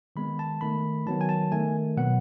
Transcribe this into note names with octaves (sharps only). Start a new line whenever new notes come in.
D#3 G#3 B3 B5
A5
D#3 A3 B5
D#3 F#3 B3 A5
G#5
A5
D#3 A3 G#5
B2 F#3 B3 F#5